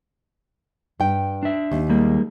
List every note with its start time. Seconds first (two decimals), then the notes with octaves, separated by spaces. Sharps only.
1.00 G2 G5
1.43 D4 E5
1.71 D#2
1.89 G3 G#3 A#3